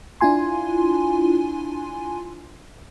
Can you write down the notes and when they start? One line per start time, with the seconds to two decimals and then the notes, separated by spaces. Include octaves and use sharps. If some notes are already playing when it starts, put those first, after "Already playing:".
0.21 D4 E4 F4 G#5 C6